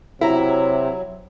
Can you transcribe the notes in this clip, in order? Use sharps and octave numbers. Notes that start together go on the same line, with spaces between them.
C3 F#3 E4 A#5